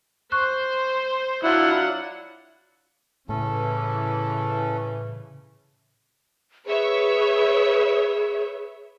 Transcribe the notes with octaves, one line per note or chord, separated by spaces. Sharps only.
C5 C#6 F#6
F#3 D4 E4 F4 F#5
A2 C#3 E3 C#4 A4
G#4 B4 C#5 E5